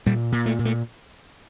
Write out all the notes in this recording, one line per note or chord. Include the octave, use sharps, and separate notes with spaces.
A#2 G3
A#2
A3
A#2
A3